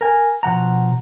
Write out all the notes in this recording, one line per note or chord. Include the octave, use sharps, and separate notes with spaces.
A#4 G#5
B2 F3 F#5 A#5